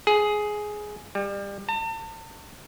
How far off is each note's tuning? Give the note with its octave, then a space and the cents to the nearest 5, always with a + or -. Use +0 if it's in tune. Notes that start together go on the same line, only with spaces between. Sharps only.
G#4 +10
G3 +30
A5 +40